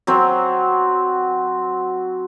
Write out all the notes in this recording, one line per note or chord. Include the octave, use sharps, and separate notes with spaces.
F#3 C4